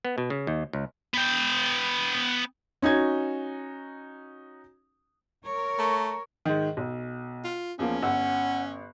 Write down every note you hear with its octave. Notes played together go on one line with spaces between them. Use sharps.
B3
B2
C#3
D#2
C#2
B3 G5
C#4 D#4 F#4 G#6
A#4 C#5
A3 A#5 C#6
G#2 D#3
B1
F4
E2 F3 A#3 C#4
G1 F#5 E6